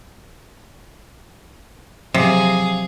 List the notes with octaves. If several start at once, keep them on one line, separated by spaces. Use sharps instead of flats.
C3 F3 F#3 G#4 F5